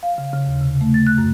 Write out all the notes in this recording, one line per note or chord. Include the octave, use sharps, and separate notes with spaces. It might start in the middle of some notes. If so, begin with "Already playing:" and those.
F5
C#3
C#3
D#2
C3
A3
A6
F#6
F#2